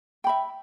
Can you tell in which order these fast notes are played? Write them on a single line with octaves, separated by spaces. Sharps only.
G5 B5 E5